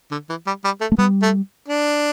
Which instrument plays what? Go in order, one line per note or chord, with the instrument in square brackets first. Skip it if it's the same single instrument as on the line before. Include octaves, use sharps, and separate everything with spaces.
[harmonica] D3
E3
G3
G3
A3
[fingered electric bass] A3
[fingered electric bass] G3 [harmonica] B3
[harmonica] A3
D4